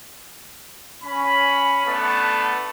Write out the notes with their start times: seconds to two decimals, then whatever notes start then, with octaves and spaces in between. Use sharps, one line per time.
1.04 C#4 B5
1.86 A3 B3 D4 A4 F#5 A5